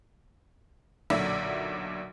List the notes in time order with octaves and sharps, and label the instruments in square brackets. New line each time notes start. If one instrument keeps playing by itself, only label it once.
[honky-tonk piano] B1 A#2 D3 F#3 D5 E5